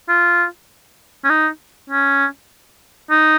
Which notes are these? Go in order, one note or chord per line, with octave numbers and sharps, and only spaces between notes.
F4
C#4
D#4
C#4
D#4